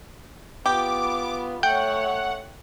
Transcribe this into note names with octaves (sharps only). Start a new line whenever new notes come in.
B3 F4 G4 D6
A3 C#5 F#5 G5